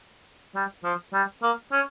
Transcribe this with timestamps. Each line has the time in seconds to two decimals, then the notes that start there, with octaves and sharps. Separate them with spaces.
0.55 G3
0.84 F3
1.14 G3
1.43 A#3
1.72 C#4